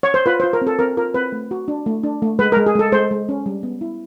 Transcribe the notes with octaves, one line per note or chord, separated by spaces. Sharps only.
C#5
C5
F4 B4
F4 C5
A#4
C4
A4
C4 A#4
F4 A#4
C4 B4
A3
F#4
D4
A3
D4
A3
G#3 B4
G#3 A#4
G#4
G#3 A4
G#3 C5
G#3
C#4
G3
B3
E4